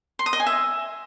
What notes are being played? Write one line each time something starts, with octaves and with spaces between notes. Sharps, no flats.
C6
D#6
D#5
G#5
E5